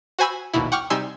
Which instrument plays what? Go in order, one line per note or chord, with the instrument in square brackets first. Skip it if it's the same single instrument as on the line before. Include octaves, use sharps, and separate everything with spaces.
[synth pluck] F#4 C5 G#5 B5 E6
A#1 D#2 B2 E4
F#5 G5 C#6 D6 F6
C3 G3 D#4 G#5 C6 E6